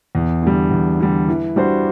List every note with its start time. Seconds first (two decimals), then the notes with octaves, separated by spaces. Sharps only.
0.15 E2
0.43 D3 G3
0.71 E2
1.00 D3 G3
1.28 E3
1.56 G3 D4 F#4 C5